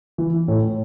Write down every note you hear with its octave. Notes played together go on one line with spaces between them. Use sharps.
E3
A2